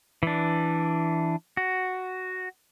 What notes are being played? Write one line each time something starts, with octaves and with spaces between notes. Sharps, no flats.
E3 D4
F#4